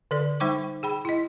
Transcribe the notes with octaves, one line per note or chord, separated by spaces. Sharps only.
D3 A4 D5
G3 D#4 C5 G5 C#6 D6
G#4 G5 B5
E4 D#5